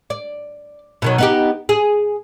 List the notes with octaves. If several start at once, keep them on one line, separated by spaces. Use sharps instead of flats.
D5
B2 D#3 F#3
B3 D#4 G4
G#4